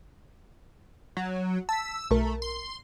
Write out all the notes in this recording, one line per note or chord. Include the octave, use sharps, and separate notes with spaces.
F#3
A5 E6 B6
B1 A3 A#4
C6